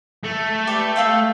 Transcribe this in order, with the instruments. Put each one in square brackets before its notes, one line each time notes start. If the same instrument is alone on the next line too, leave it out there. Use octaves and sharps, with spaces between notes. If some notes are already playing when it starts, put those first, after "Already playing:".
[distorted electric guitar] A3
[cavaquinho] G4 B4 D5
E5 F5 G5